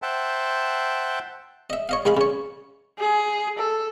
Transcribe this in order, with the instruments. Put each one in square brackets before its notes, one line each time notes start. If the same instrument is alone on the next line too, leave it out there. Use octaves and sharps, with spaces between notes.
[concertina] C5 E5 F#5 G5 A5
[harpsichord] D#5 E5
C#5 D#5 F5
C2 G#3 G#4 F5 B5
C#3 C#5
[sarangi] G#4
A4